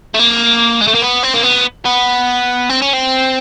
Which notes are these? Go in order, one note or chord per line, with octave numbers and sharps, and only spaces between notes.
A3
A#3
G#3
A3
A#3
B3
C4
A#3
B3
B3
C4
C#4
C4